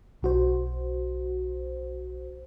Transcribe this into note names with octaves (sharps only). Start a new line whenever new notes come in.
B1 F#4 C5